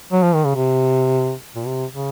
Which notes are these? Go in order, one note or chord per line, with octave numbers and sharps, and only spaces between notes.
F#3
F3
D#3
C#3
C3
A#2
C3
C#3